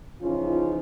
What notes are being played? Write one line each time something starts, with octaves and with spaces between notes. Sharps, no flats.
C#3 E3 F3 C#4 D#4 F4